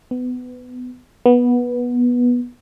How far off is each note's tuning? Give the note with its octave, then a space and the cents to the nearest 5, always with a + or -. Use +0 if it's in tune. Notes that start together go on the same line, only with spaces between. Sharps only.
B3 +20
B3 -15